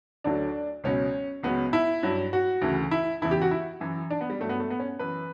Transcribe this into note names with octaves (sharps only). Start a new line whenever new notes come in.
D2 D3 F#3 D4
C#2 B2 F#3 C#4
C#2 C#3 F#3 B3
E4
G2 F#3
F#4
D2 C#3 E3
E4
E2 C#3 E3 E4
G4
F#4
E4
F#2 E3
D4
B3
G3
G2 F#3 A3
B3
A3
B3
C#4
F#2 E3 B4